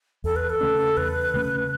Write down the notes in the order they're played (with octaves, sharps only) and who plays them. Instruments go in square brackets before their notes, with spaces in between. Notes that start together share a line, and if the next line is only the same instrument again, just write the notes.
[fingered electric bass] E2 [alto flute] A4
[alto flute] B4
A4
[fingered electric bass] C#3 A3 C#4
[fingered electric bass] E2 [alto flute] B4
[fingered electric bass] C#3 A3 C#4